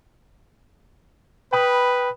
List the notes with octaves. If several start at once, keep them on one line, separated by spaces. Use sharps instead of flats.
B4 G5 B5 D#6